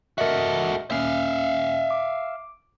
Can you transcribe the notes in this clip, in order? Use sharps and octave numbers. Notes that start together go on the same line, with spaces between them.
F#4 A4 A#4 D#5 E5
A#3 C#4 E5 F5 C7
D6